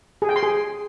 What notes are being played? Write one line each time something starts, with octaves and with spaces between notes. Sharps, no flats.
G#4
G5
C6
G#4